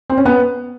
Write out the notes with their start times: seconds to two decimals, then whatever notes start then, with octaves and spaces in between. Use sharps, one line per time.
0.10 C4
0.18 C#4
0.25 B3